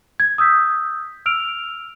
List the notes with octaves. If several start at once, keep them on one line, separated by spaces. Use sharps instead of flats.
G#6
D#6 E6 G6 B6
E6 F6 D7 F7